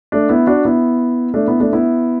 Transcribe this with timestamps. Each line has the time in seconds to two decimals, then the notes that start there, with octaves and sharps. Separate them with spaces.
0.12 A3 D4
0.29 B3 E4
0.47 D4 F#4
0.65 B3 E4
1.34 A3 D4
1.47 B3 E4
1.60 A3 D4
1.73 B3 E4